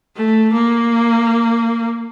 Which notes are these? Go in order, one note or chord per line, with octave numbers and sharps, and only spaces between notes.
A3
A#3